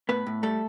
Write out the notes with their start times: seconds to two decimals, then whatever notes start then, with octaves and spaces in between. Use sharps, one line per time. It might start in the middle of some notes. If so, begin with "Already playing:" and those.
0.09 A2 B3 B4
0.26 A2
0.43 G3 A3 A4